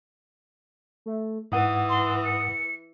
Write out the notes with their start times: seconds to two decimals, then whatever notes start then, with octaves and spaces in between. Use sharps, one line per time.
1.06 A3
1.52 G#2 E3 F#5 D#6
1.89 C6
2.26 C#7